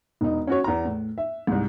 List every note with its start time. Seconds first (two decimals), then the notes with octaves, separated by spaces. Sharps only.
0.21 E1 D#4
0.47 C#4 F#4 C#5
0.64 E2 A#5
0.85 A2
1.18 E5
1.47 C2 G#2